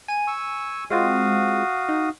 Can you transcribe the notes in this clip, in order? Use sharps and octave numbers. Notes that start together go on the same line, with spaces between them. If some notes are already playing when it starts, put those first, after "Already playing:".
G#5 D#7
C#6 E6
G#3 C4 F4 F#4 F5 D#6
D#4